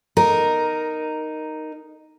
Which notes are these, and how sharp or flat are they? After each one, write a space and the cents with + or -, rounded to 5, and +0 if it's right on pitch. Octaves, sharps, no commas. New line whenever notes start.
D#4 -5 A#4 +0